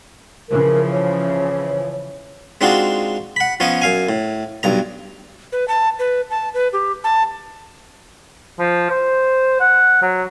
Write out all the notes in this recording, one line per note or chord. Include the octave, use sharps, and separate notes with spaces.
C#3 E3 F3 A#4
C#5
G#3 C4 D4 D#4 F4 F#4
F#5 B5
F3 B3 C#4 C#5 D#5
F#2 F5 G#5
A2
B1 G2 A#5
B4
A5
B4
A5
B4
G4
A5
F3
C5
F#5
F#3